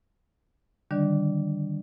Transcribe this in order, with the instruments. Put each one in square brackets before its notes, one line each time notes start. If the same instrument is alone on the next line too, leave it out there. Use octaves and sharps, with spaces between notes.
[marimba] D3 D#3 G3 D4 D5